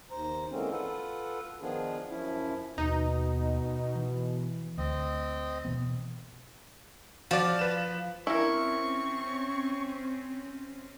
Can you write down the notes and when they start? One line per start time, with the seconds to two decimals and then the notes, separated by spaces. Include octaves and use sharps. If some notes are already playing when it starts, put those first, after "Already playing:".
0.11 D#2 C5 A#5
0.51 D3 E3 G#3 A#3 C4 C#4
0.71 F4 A4 B4 F#5
1.61 D#3 F3 B3 D4 F4 G#4
2.09 F#2 F3 C#4 E4
2.78 D#2 B2 D#4
3.95 E3
4.78 D2 C4 D#5
5.65 B2 E3 B3
7.31 F3 F#4 D5
7.59 B4 E7
8.27 C4 C#4 E4 A#4 C#6